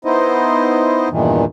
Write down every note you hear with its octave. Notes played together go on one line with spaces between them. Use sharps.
B3 D#4 E4 C5 D#5
E2 G2 A#2 D#3 E3